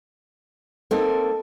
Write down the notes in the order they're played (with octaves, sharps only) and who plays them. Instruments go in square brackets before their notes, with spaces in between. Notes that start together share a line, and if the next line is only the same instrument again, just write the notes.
[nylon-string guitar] A#3 C4 D#4 [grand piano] A4